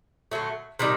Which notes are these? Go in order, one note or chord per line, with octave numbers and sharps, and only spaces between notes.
D3 F#3 A3
C3 D#3 G3